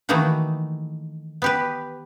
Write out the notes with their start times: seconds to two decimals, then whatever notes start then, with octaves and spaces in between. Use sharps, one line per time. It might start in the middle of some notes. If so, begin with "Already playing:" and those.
0.09 D#3 E3 A3 A#3 D#4 F#4
1.42 B3 G4 B4